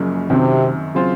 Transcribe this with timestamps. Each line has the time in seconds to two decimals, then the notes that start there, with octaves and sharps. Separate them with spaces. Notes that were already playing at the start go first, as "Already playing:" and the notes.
Already playing: F#1 F#2 C#3 F3 A#3
0.30 F#2 C3 D#3 F#3 C4
0.95 C#3 F#3 C4 F4 C5